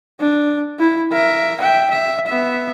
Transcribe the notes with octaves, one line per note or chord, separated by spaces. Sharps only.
D4
E4
A#4 E5
E5 G5
E5
B3 E5